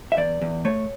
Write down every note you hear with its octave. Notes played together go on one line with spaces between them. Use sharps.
E5
E2 D5
E2
A3 C#5